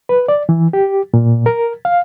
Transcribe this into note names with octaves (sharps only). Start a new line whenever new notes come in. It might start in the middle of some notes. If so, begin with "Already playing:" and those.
B4
D5
E3
G4
A#2
A#4
F5